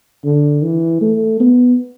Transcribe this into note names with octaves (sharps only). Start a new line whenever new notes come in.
D3
E3
A3
B3